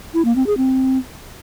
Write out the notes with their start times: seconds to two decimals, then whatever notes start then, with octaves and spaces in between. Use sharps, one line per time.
0.14 E4
0.25 A#3
0.36 C4
0.47 G#4
0.57 C4